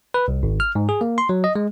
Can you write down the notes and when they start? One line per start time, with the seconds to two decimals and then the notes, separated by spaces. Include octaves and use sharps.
0.14 B4
0.28 C2
0.43 G#1
0.60 F6
0.75 G#2
0.89 G#4
1.01 A#3
1.18 C6
1.29 F#3
1.44 D#5
1.56 G#3